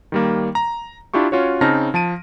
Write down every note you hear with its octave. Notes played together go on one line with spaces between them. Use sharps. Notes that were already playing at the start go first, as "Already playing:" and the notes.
D#3 G3 A#3
A#5
D4 E4 F4 G4 C#6
C#4 F4 F#4 C#5
C#3 C4 D#4 A5 F6 A#6
F3 A5 D7 D#7